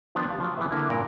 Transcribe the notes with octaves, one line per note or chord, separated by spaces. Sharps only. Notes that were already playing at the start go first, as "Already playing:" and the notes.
D#3 F3 B3 D4 C5
G4 F5 A5
F3 F#3
E3 B3 G#4 B4 E5
D3 A#3 E4
G2 A#2 A#4